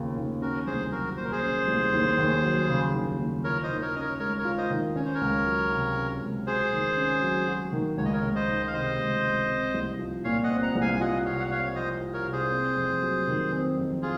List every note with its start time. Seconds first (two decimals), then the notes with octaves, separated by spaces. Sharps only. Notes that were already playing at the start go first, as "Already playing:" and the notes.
Already playing: D#2 C#3 F3 A#3
0.16 D#2
0.41 C#4 F#4 A#4
0.66 C2 G#4 C5
0.92 F#3 F#4 A#4
1.17 A#2 C5
1.24 A#4
1.32 G#4 C5
1.43 C#4
1.68 C2
1.93 D#2
2.18 D#2
2.44 F#3
2.68 C#3
2.94 D#2
3.18 D#2
3.44 F4 A#4 C#5
3.63 C5 D#5
3.69 D#3
3.81 A#4 C#5
3.95 C#4 D#5
4.00 A#4 C#5
4.19 G#3 A#4 C#5
4.38 A#4 C#5
4.45 F4
4.58 C5 D#5
4.70 D#3
4.96 C#4 C#5
5.05 C5
5.14 A#4 C#5
5.21 C#2
5.45 F#3
5.71 C3
5.96 C#4
6.22 C#2
6.46 F#4 G#4 C5
6.72 D#3
6.97 C#4
7.22 F#3
7.47 F#4
7.73 D#3
7.98 C#2 C#5
8.05 D#5
8.13 A#4 C#5
8.23 C#2
8.35 C5 D#5
8.48 D#3
8.67 F5
8.73 C3 C5 D#5
8.99 C#2
9.24 C#2
9.49 C4
9.74 C2
9.99 F3
10.24 A#2 C#5 F5
10.44 D#5 F#5
10.50 C4
10.63 F#5 A#5
10.75 C2
10.81 F5 G#5
10.93 G#5
11.00 F4 D#5 F#5
11.25 C3 C#5 F5
11.39 F#5
11.51 C4 C#5 F5
11.65 C#5
11.76 F3 C5 D#5
12.01 F4
12.14 A#4 C#5
12.27 C3
12.32 G#4 C5
12.52 C4
12.77 F2
13.02 F#3
13.28 D#3
13.52 C4
13.78 F2
14.02 F4 G#4